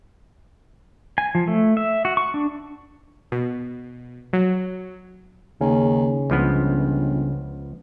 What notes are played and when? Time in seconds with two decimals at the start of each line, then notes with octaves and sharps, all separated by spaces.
1.18 G#5
1.35 F3
1.47 A3
1.77 E5
2.05 F#4
2.17 C#6
2.34 D4
3.32 B2
4.33 F#3
5.61 D#2 C#3 C#4
6.30 G1 C#2 F3 B3